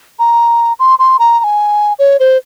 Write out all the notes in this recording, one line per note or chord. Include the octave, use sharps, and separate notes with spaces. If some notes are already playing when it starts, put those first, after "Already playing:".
A#5
C6
C6
A#5
A#5
G#5
C#5
C5